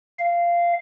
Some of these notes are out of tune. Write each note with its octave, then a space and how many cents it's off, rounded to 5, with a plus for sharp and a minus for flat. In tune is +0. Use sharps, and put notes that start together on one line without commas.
F5 -15